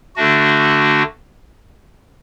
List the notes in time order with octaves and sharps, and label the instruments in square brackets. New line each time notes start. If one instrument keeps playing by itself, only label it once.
[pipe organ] D3 A3 D4 F#4